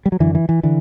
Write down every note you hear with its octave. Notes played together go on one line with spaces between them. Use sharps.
G3
F#3
F#2 D3 E3
E3
E3
D3 E3